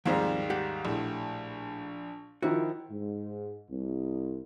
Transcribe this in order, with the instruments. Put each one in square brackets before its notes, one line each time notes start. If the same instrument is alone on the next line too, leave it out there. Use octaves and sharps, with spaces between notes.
[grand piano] D#2 G#2 G3 [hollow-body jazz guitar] F3 G#3 C4
[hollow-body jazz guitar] G4 F#5
[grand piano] A#1 [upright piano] A2
[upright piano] D#3 F3 E4 [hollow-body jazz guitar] F#4
[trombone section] G#2
C2